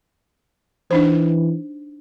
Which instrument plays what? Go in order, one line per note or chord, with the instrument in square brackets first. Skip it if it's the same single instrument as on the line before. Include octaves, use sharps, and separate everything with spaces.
[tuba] E3 [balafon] D4 D#4 C5